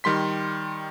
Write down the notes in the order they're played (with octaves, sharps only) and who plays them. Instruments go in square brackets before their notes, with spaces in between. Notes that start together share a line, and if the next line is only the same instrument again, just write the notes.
[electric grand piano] D#3 G3 C6 B6